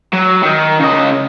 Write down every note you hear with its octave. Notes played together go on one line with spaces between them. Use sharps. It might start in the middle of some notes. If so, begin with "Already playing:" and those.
F#3
D#3 D#4
C#3 D#5